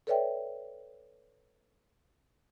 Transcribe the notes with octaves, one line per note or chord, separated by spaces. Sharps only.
A4 B4 C#5 D5 E5 G5